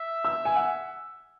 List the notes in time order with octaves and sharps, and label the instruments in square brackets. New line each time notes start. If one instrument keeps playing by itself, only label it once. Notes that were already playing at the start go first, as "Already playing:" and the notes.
Already playing: [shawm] E5
[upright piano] E6
G#5
F#5